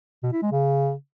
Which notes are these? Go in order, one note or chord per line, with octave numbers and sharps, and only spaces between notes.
B2
E4
G#3
C#3